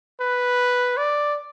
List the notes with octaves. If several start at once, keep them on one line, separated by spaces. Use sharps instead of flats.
B4
D5